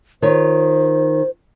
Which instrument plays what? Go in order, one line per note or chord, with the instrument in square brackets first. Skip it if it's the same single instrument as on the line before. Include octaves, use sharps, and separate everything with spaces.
[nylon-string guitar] D#3 F4 C#5 [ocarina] C5